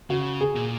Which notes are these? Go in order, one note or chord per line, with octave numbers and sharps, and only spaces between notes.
C#3 F#4
G#4
A#2